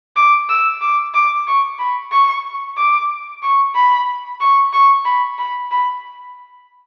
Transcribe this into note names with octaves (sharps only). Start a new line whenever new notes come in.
D6
E6
D6
D6
C#6
B5
C#6
D6
C#6
B5
C#6
C#6
B5
B5
B5